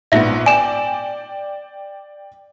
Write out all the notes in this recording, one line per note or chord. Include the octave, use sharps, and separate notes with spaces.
A#1 G#2 B3 E5 A#6
D5 G5 G#5 D6 E7